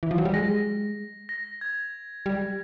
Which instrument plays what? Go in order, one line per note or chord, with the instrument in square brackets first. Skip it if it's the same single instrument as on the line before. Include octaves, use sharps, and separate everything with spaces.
[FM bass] E3
F3
F#3
G3
[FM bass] G#3 [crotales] A#6
[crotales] A#6
G#6
[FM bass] G3